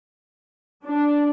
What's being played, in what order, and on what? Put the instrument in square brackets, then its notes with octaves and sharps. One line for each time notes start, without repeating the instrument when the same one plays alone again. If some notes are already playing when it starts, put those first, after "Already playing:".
[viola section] D4